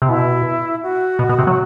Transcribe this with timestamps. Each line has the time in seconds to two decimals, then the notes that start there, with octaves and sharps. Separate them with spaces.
0.02 C3
0.09 B2 E4
0.83 F#4
1.19 B2
1.29 B2
1.39 C3
1.47 F#3